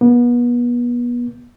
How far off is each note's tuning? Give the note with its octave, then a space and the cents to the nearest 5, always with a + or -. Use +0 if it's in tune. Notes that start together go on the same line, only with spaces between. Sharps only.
B3 -30